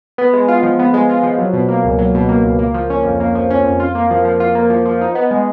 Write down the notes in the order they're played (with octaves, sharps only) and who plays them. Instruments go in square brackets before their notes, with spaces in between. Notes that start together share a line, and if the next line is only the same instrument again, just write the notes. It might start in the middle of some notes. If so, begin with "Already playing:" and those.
[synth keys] B3
G#3
F4
F3
B3
G#3
F4
F3
F#3
B2
A#3
C#2
F#3
B2
A#3
C#2
A#3
F3
C#4
F2
A#3
F3
C#4
F2
F4
A#3
F3
F3
F4
A#3
F3
F3
D#4
B3
G#3